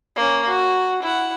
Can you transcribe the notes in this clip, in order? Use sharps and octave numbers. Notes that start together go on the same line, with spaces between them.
A#3 C#4
F#4
E4 F#5